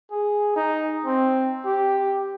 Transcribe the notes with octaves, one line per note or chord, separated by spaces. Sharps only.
G#4
D#4
C4
G4